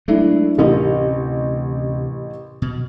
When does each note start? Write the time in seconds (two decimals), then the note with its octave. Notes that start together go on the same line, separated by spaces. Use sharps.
0.08 F#3 G#3 A3 D4 E4
0.58 A1 D2 C3 C#4 G4 A#4
2.62 B2